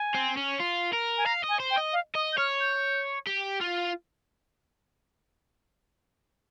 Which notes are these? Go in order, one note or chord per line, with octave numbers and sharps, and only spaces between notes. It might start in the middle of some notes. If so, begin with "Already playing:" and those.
Already playing: G#5
C4
C#4
F4
A#4
G#5
F5 A#5
D#5
G#5
C5
G5
D#5
F5
D#5 D#6
G6
C#5 F6
G6
G4
F4